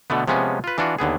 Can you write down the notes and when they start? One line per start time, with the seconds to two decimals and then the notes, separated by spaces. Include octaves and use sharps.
0.10 B2 D3 A3 B3
0.28 C3 F3 G#3 B3 C#4
0.64 F4 B4
0.78 E3 D4 F4 F#4
0.99 D#2 D3 B3 G#4